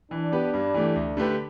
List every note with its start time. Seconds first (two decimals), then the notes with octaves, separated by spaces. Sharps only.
0.11 E3 D4
0.32 B3 G4 B4
0.54 G2
0.74 E3 A3 G4
0.96 D2
1.17 D3 A3 G4 B4